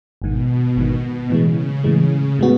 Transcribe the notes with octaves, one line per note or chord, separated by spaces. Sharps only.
G#1 G#2 B2 D#3
G#1 G#2 D#3
A2 C#3 E3 G#3
A2 C#3 E3 G#3
A2 G#3 B3 F#4